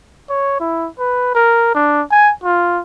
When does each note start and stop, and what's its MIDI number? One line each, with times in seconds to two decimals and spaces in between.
0.29 0.59 73
0.60 0.88 64
0.99 1.34 71
1.35 1.73 70
1.75 2.02 62
2.11 2.32 80
2.44 2.81 65